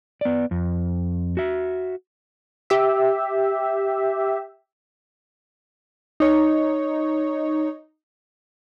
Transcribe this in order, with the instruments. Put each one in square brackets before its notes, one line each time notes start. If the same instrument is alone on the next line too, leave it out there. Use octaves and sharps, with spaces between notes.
[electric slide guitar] B3 D5
F2
F#4 E5
[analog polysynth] G4 E5
[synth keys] D#4 C#5